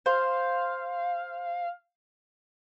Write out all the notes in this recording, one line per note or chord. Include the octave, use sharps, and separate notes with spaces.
C5 F5